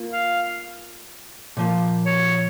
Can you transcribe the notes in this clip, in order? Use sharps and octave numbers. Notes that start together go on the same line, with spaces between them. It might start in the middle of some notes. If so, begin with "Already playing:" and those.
Already playing: A#3 F4
F5
A#2 F3 A#3
C#5